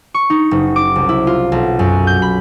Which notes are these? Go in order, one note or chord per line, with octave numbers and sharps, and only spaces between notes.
C#6
D#4
F#1
D6
C2
E4
F4
B1
F#2
G6
B5